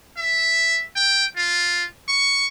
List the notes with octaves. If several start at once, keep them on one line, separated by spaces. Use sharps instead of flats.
E5
G5
F4
C#6